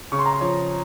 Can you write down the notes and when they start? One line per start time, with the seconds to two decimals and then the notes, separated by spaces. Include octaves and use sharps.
0.12 C#3 C#6
0.19 C6
0.26 A#5
0.33 C6
0.41 F3 C#5